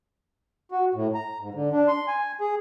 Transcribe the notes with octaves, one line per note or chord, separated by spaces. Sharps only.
F#4
A2
A#5
G#2
D3
D4
C6
G#5
G#4